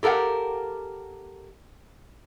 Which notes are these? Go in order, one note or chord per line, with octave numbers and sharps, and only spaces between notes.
G4 A4 A#4 F5 F#5